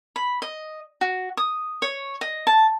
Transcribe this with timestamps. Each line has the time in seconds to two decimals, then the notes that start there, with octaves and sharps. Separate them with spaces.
0.16 B5
0.42 D#5
1.01 F#4
1.37 D#6
1.82 C#5
2.21 D#5
2.47 A5